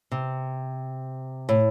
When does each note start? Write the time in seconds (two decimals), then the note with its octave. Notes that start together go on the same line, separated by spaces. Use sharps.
0.12 C3
1.49 A2